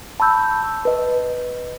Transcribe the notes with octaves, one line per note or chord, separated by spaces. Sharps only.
A5 B5 C#6 E6 G6
B4 D#5